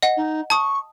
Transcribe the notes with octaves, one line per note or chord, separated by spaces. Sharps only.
D#5 F#5
D#4
A5 C#6 D#6